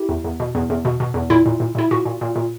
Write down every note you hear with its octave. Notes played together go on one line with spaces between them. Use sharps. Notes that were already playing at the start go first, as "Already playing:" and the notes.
Already playing: E4 G4
E2
E2
B2
E2
E2
B2
B2
E2
A#2 E4
A#2
A#2
A#2 E4
A#2 F#4
A#2
A#2
A#2